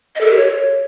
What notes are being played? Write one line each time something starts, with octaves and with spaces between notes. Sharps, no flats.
D#5
A4
A#4
G4
C#5